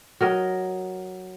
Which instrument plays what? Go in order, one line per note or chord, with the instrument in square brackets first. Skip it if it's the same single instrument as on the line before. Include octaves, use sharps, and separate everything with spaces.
[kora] F#3 A#4 D#5